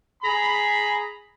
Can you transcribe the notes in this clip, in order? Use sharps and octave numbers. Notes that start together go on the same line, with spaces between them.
G#4 A#5 B5